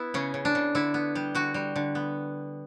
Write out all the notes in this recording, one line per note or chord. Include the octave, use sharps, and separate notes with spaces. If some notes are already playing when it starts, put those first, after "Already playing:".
Already playing: B3 E4
C#3 C#4
C#3
D4
C#3
D3 E4
B3
G3
D3 F#4
G3
D3
B3